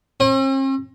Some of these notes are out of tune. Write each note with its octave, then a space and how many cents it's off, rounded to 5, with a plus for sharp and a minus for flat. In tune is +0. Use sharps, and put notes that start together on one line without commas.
C4 +45